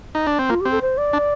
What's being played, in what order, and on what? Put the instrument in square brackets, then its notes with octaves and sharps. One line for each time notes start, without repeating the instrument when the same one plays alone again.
[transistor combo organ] D#4
D4
C4
[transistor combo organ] A#3 [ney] F4
[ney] G4
[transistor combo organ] C4
[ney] A4
C5
D5
[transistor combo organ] D4